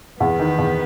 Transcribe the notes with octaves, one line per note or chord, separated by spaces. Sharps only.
E2 B3
D#3
E2